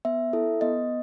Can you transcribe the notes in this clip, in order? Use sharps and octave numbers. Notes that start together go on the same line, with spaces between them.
B3 E5
E4 A4
B3 D#5